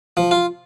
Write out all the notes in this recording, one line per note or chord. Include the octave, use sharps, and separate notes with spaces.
F3
F4